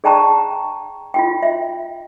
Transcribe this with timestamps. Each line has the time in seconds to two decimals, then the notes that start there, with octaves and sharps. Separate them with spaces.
0.04 G#4 D5 G5 A5 A#5 C#6
1.14 F4 F#4 G5
1.43 E5